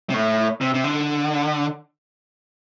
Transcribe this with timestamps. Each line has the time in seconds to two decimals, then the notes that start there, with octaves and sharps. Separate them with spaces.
0.10 C3
0.14 A2
0.61 C3
0.74 C3
0.84 D3